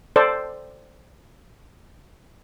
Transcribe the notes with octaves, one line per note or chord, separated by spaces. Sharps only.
A4 C5 D5